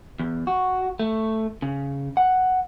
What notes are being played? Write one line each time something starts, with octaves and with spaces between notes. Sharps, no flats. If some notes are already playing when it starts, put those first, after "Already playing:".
E2
F#4
A3
C#3
F#5